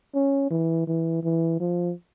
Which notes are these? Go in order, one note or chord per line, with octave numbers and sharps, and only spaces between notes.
C#4
E3
E3
E3
F3